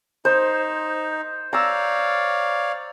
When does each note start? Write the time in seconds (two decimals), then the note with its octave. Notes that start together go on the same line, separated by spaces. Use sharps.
0.25 D#4 C5
1.53 C#5 D5 F5 A#5 E6